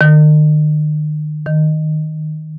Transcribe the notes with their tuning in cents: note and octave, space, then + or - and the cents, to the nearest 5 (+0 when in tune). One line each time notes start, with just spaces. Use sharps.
D#3 -40
D#3 -5